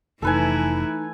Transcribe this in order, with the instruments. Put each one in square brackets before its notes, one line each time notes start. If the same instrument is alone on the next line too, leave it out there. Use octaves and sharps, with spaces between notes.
[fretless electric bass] F1 [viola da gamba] E3 A3 E4 [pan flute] D#4 [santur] A4 B4 G#5